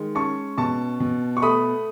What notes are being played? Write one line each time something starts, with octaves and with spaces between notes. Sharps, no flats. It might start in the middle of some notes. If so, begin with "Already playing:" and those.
Already playing: D#3 G#3
C#4 A5 C#6
B2 A5 C#6
B2
C#6
A3 B5 D#6